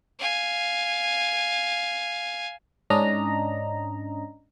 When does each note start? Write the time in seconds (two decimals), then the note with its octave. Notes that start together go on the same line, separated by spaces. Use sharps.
0.19 F5 G#5
2.90 G#2 C#4 D4 D#5 A#5